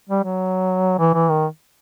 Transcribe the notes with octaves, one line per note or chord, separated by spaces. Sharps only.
G3
F#3
E3
E3
D#3